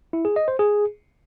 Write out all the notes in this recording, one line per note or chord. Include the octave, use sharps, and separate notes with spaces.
E4
G#4
D#5
C5
G#4